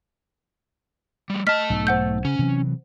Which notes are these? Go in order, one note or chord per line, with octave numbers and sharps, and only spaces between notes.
G3 A3
A3 D#5 A5 F6 B6
B1 G#2
C5 F#5 G6
C#3 C#4
C3 E3 F#3